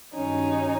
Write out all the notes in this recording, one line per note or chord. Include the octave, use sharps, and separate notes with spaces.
G2 D#3 F#3 C#4 D#4